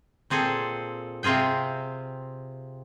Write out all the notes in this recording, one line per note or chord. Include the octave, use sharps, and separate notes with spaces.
A#2 C4 G#4 A4
C3 C4 F4 G#4 G5